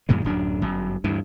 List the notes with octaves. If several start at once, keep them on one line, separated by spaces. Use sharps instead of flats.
F#2 A#2 D#3 G#3
D1 F#2 D4
G1 F#2
D2 G2 E3